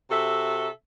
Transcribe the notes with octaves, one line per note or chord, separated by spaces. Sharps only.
C3 F#4 A4 E5